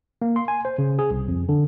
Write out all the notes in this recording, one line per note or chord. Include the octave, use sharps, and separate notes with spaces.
A#3
C6
G#5
C5
C#3
G#4
C2
F2
D3